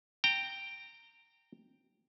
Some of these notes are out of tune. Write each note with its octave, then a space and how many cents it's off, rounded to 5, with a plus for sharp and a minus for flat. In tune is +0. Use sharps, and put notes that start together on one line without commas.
G5 +0 A#5 -20